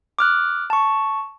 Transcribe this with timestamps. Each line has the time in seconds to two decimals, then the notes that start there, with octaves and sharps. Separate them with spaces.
0.19 D6 F6 F#6
0.70 A5 C#6